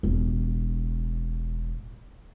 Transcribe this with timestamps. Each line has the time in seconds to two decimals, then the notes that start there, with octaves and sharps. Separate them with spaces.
0.03 E1 A1